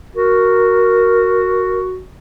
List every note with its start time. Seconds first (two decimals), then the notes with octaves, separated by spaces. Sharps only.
0.15 F#4 A#4